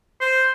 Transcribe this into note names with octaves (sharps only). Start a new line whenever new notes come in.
C5